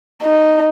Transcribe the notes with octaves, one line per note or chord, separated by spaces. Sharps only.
D#4